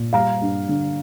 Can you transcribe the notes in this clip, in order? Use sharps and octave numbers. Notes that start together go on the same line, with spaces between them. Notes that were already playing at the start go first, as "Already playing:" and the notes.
Already playing: A#2
G3 F5 A#5
G2
D3